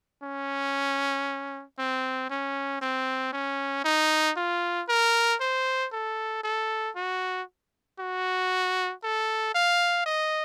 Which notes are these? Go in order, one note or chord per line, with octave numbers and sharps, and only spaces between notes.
C#4
C4
C#4
C4
C#4
D#4
F4
A#4
C5
A4
A4
F#4
F#4
A4
F5
D#5